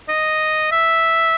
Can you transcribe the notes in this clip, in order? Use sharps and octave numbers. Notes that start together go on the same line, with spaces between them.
D#5
E5